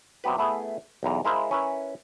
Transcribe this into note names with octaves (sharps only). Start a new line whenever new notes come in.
C3 F#3 B3 G4 B4
A3 B3 E4 G#4
B1 E2 A#5
G#3 E4 A#4 C5 F5
C#4 E4 A#4 B4